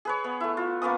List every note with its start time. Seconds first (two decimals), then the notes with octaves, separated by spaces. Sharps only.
0.05 G#4 B4 C#5
0.24 B3
0.40 A3 E4
0.57 F4
0.82 A#3 B3 C#4 D#6